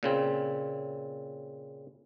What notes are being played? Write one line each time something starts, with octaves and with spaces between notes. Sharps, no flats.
A#2 C#3 C4